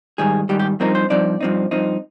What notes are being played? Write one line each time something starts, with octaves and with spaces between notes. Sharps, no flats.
G#2 D#3 G3 G#4
G#2 D#3 G3 G4
G4
G2 F3 C4 D#4 A#4
C5
G2 F3 C4 D#4 D5
G2 F3 C4 D#4
G2 F3 C4 D#4